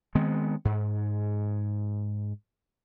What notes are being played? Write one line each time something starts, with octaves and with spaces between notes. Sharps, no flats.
D#3 G#3 B3 C4
G#2